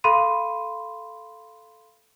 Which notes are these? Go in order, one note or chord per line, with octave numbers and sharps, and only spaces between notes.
A4 F5 B5 C6 D#7